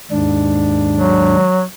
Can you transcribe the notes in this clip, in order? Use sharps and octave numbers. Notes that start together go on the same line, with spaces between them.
D#2 G#2 D4
F#3